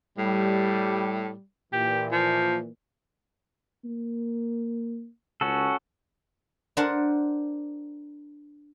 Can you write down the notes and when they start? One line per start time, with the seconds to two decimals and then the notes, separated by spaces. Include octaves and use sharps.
0.18 A2 G3
1.73 A#2 E3 G4
2.12 F3
3.84 A#3
5.41 C#2 C#4 F#4 A4
6.77 D4 A#4 C5 F#5 A5